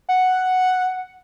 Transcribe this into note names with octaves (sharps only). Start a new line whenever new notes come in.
F#5